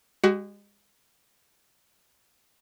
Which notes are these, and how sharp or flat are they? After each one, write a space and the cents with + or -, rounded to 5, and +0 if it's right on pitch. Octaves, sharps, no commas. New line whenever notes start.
G#3 -30 F#4 +30